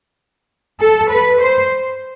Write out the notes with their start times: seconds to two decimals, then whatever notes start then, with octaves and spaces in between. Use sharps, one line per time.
0.80 A4
1.09 B4
1.40 C5